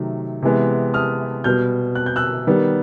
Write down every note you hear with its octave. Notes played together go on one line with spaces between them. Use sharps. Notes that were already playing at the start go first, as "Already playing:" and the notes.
Already playing: C3 D#3 F#3 A3
C3 E3 G#3 B3
D#6 F6
B2 G3 B3 F6 G6
F#6
G6
E6 F#6
D#3 G3 B3